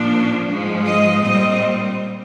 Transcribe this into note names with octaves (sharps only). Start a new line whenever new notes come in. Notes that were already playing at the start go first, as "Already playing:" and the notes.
Already playing: A#2 F3 A#3 D4
G#2 F3 G#3
D#5
A#2 G3 C4 D#5